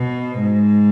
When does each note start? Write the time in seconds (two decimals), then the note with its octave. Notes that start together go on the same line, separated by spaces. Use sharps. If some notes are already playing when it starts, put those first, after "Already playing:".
Already playing: B2
0.41 G#2